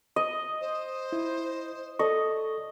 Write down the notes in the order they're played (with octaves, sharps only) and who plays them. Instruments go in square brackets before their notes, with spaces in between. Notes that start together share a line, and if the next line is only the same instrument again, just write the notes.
[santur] D#5
[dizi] C5
[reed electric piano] E4
[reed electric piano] A4 D5 C#6 [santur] D#5